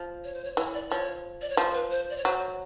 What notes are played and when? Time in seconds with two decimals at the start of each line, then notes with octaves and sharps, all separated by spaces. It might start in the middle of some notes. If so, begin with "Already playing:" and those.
Already playing: F3
0.24 C#5
0.34 C5
0.44 C#5
0.57 E3 C#5
0.74 D5
0.91 F3 C#5
1.42 D5
1.50 C#5
1.57 F3 C5
1.74 B4
1.91 C5
2.10 D5
2.17 C#5
2.24 F#3 C5